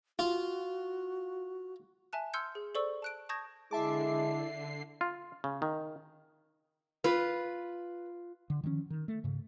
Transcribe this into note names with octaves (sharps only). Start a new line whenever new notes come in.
F4 F#4
E5 G#5 A5 F#6
C6 E6 F6 G6 G#6 C#7
G#4
A4 C5 D5 C#6 E6
A5 F#6 D7
A5 C#6 D#6 G6 G#6 A#6
D3 G#3 E4 E5 A5 D6 C7
F4
C#3
D#3
F4 B4
D3
D#3 F3 G#3 C#4
D#3
A3
G#2 C#3